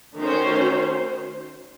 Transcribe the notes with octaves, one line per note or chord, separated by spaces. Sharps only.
D#3 A3 C#4 F#4 C5